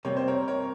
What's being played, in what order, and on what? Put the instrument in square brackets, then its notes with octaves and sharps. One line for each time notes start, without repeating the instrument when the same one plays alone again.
[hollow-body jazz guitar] C3 G3 A#3 [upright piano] C#5
[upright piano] C5
A#4 C#5
A#4 C#5